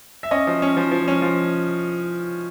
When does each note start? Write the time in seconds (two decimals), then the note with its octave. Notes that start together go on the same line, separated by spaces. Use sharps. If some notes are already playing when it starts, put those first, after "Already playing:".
0.23 E5
0.31 C#4 D#5
0.47 F3
0.62 C#4
0.77 F3
0.92 F3
1.08 C#4
1.22 F3